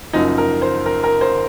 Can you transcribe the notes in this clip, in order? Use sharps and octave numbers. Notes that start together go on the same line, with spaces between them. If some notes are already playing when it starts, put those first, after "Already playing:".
F#1 F#2 F3 D#4
A#4
C5
A#4
A#4
C5